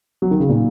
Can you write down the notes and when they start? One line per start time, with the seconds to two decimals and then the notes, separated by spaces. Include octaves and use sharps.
0.22 F#3
0.31 D#3
0.40 C#3
0.49 A#2 D#3